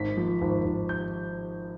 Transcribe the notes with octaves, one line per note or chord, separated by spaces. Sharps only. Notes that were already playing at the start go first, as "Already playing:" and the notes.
Already playing: G#1 B6
F3
G#1
G#1
G6